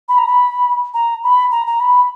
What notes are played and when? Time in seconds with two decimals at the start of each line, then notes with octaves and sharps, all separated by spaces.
0.09 B5
0.18 A#5
0.27 B5
0.94 A#5
1.24 B5
1.51 A#5
1.67 A#5
1.80 B5